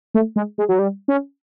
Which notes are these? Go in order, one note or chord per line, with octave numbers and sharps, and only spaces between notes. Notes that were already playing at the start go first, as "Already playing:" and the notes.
A3
G#3
G#3
F#3
G3
C#4